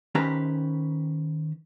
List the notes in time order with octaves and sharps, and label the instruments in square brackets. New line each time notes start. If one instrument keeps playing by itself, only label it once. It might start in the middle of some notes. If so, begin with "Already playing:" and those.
[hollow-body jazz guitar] D#3 C#4 G4 B4 C5 A#5